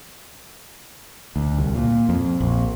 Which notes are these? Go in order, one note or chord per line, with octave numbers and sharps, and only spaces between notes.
D2
C2
A#2
F2
A#1